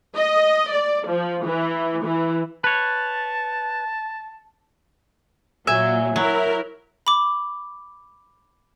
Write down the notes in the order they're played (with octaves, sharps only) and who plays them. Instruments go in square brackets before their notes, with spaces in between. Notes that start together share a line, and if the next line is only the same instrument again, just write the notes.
[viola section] D#5
D5
F3
E3
E3
[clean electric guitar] B4 C#5 [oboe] A5
[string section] A#2 F#3 [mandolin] E5 G#5
[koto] F#3 [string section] E4 A#4
[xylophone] B5 D6